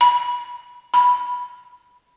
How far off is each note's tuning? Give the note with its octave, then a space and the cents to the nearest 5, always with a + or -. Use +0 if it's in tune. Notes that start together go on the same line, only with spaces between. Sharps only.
B5 -20
B5 -10